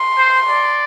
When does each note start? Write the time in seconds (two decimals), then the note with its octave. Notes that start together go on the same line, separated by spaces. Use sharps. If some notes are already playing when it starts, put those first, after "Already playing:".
Already playing: C6
0.18 C5
0.48 D5